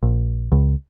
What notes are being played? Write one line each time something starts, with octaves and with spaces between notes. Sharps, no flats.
A#1
C#2